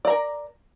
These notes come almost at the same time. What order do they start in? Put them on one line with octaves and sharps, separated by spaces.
D5 A#5 A#4